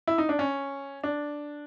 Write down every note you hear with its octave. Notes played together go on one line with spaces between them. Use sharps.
E4
D#4
D4
C#4
D4